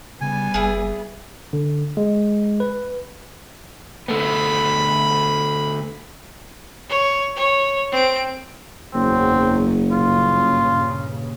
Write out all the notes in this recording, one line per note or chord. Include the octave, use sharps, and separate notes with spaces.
C#3 G3 B3 G#5
F#1 E4 G#4
D3
G#3
B4
D3 A3 B3 B5
C#5
C#5
C4 D7
F#1 E2 F#3 C4
G2 A#2 C#3 F4